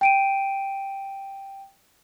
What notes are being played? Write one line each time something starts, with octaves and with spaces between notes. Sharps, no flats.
G5 D7 D#7